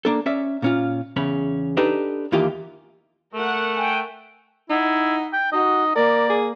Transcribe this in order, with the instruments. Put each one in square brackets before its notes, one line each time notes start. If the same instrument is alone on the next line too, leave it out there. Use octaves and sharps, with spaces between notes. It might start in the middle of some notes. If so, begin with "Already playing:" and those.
[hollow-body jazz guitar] A#3 D4 A4
C#4 D5 E5
A#2 C#4 F4
E2 C#3 C#4 B5
D4 D#4 G4 A4 B4
D#2 E3 A#3 F4 G4 D#5
[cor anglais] A3 [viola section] A#4 F#5
[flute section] G5 G#5
[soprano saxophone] D#4 [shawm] E4 [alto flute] F#5
[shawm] G5
[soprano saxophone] D#4 [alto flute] F#4 [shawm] D#5
[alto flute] A#3 [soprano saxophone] A#4 [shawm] D5
[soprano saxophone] G#4